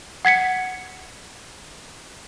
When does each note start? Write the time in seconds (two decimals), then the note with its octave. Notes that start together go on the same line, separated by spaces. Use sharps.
0.25 F#5 G#6 B6 C#7